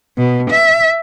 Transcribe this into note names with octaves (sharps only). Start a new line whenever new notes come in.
B2
E5